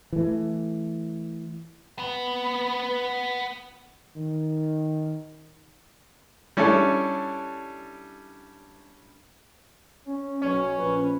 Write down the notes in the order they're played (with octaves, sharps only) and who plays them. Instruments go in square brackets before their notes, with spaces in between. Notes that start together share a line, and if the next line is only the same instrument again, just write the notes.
[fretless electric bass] E3 A3
[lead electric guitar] B3 B4
[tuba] D#3
[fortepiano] G3 C#4 D4 E4 A4
[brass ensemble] C#4
[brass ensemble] B1 [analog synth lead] C#4
[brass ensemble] A#1 B4